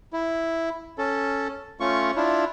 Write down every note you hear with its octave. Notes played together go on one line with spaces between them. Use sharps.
E4
C#4 A4
A3 C#4 F4 C#6
D4 E4 F4